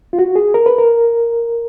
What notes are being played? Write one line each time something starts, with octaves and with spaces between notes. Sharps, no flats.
F4
F#4
G#4
A#4
B4
A#4